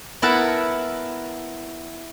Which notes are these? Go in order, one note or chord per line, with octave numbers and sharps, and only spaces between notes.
B3 E4 A#4 B4 F#5 A5